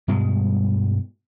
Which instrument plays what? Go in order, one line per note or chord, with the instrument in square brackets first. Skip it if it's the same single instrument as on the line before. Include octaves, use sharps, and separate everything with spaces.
[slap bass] G2 B2 G3 G#3